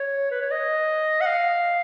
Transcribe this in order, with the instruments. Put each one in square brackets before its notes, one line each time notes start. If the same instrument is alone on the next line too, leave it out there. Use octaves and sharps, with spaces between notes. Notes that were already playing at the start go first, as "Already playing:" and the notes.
Already playing: [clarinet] C#5
B4
C#5
D#5
F#5
F5